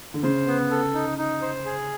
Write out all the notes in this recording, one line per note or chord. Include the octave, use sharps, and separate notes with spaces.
D3
C#3 C5
B3
A4
D#4
D#4
C5
G#4